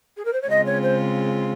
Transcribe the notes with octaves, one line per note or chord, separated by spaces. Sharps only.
G#4
A#4
C5
C#5
C#3 G#3 C4 F4 D#5
C#5
C5